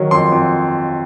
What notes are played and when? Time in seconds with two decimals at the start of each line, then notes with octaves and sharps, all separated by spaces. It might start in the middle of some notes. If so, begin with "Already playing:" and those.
Already playing: D#3 F#3
0.11 F2 C6
0.32 F2